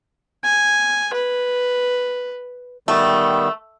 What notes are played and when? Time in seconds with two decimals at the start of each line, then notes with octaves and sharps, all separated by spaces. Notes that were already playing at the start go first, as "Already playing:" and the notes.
0.45 G#5
1.13 B4
2.88 D#3 G3 A3 B3